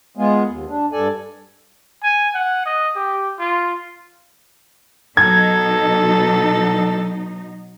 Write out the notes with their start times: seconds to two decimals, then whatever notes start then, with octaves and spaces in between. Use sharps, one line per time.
0.17 G#3 B3 F4 G#4
0.48 D#2
0.68 D4
0.92 G2 A4 D5 G#5
2.04 G#5
2.35 F#5
2.66 D#5
2.96 G4
3.40 F4
5.17 B2 F#3 D#4 A4 G#6